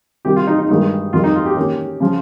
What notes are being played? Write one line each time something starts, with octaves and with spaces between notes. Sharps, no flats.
C3 D#3 G3 G4
F4
D#4
D#4
G2 D#3 G#3 D#4
F2 D#3 G3 F4
D#4
F4
G4
D#3 A#3 C#4
C#3 F3